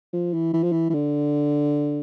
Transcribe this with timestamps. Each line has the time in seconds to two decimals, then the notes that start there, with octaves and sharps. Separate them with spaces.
0.13 F3
0.34 E3
0.53 E3
0.64 F3
0.72 E3
0.90 E3
0.94 D3